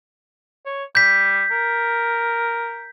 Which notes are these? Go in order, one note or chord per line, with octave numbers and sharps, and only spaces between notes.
C#5
G3 G6 B6
A#4